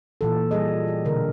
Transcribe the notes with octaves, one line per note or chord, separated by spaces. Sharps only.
A#2 E3 A4
G3 G#4 D#5
G4
B2 D3 A#4